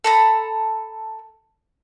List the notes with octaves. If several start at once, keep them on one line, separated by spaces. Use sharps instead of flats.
A4 A#5 B5